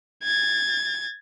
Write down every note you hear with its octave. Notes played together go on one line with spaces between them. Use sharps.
G#6 A6